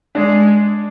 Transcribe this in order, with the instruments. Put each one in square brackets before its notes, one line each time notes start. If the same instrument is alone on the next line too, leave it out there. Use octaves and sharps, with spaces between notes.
[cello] G#3 [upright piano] D4